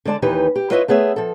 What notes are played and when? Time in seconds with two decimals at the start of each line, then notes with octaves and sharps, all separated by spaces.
0.05 D3 G#3 D5 A5
0.22 D#2 E3 D#4 G4 B4
0.56 G4
0.70 E4 F4 B4 C#5 D#5 E5
0.88 A3 B3 G#4 C#5 E5
1.16 F3 A4